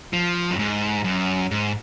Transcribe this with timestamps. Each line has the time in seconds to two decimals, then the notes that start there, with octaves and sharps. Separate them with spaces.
0.13 F3
0.51 F#2
0.59 G#2
1.04 F#2
1.51 G#2